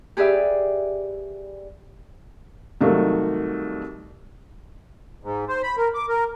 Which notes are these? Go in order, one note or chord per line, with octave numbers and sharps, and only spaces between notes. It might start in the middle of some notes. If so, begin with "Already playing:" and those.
G4 G#4 B4 D5 E5
C2 D#3 F#3 A3 F5
G#2
C5
B5
A#4
D6
A#4